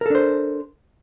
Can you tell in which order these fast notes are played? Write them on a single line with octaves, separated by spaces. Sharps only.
A#4 A4 D4 C5